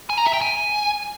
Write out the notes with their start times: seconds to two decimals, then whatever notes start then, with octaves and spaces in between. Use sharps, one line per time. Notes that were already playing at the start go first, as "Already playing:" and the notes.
0.10 G#5
0.18 A#5
0.25 E5
0.33 G5
0.41 G#5